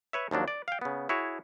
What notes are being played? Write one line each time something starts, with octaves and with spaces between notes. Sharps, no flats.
B4 C#5 E5
D#2 F3 F#3 D4
D5
F5 G5
C#3 B3
E4 F#4 G#4 C#5